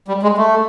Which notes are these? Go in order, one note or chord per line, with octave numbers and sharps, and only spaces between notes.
G3
G#3
A3